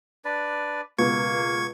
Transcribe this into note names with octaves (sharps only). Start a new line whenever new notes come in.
D4 B4 D5
C#2 B2 A#3 B3 C#6 G#6 C#7